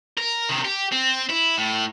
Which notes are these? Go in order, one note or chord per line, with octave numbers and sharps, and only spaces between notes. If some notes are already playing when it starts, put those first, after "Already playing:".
A#4
C3 D#3
G4
C4
E4
A2